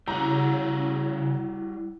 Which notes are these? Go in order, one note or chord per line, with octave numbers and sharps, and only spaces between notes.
C#3 G3 E4 F#4 A#5